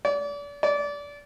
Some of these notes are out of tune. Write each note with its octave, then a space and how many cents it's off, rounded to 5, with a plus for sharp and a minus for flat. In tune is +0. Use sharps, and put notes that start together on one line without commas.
D5 -35
D5 -25